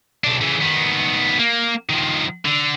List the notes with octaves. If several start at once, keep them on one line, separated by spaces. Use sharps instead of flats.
B1 D4
C#3 E3
D#3 B3
A#3
D#3 F3
D3